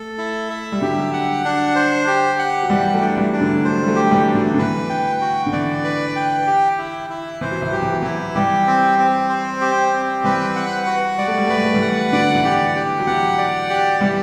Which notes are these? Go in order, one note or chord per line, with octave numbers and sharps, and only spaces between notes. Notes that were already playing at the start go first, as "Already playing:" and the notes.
Already playing: A3 A4
E4
E5
G3
D3 F#3 G4
F#5
D4
C5
G4
F#5
F#3
E3 G3 G4
F#3 A3
D4
E3 G3
D4
D3 F#3
F#3 A3 C5
G3
F#3 A3
G4
F#3
E3 G3
D4
D3 F#3
D3
E3 B4
G5
F#4
D3
E3 D5
B4
G5
G4
E4
E4
E3 C5
F#3
E3
F#3 G4
E3
F#3
E3 E4
E3 G3 G4
C4
C4
C5
G4
C4
E3 G3 B4
F#5
F#4
G3 D5
A3
G3
A3 B4
G3
A3
E3 G3
F#5
D3 F#3 D5
F#3
E3
D3 G4
G4
F#3
E3 F#5
D5
G4
E3 G3 G4